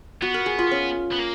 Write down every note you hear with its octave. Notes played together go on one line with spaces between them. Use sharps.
B3 F#4
A#4
G#4
F4
C#4
B3
A#3